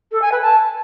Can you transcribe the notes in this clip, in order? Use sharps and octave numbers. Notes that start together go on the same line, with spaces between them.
A4
G#5
B4
A5